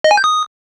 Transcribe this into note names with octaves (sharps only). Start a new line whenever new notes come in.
D#5
G#5
G6
D#6